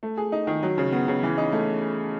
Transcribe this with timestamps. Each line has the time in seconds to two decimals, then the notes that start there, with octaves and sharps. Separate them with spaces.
0.03 A3
0.17 G#4
0.32 D#4
0.47 D#3
0.63 F#3
0.78 C#3
0.92 B3
1.08 C#3
1.23 E3
1.38 D#4
1.52 A3